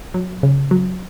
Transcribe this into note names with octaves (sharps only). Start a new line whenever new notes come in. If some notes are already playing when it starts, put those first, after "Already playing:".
F#3
C#3
F#3